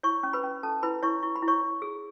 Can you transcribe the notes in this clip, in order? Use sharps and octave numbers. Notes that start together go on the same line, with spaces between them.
E4 C#5 C#6
C#4
B4 B5
C#4
C#4 A4 A5
E4 B4 B5
E4 C#5 C#6
E4 C#6
B5
E4
C#5 C#6
E4
G#4